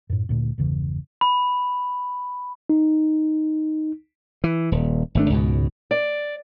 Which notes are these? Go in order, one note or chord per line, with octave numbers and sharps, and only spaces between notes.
F#2 A2
D2 A#2 A3
G1 E2 C#3 E3
B5
D#4
E3
D#1
G#1 A3 D4
C#2 G#2 B2
D5